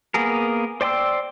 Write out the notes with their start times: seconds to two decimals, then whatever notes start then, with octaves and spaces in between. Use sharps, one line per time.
0.14 A#3 B3 G#4 A#4
0.81 C5 D5 G5 C6 E6